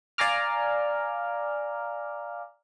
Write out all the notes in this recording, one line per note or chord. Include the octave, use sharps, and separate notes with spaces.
D5 F5 G#5 A#5 D6 F6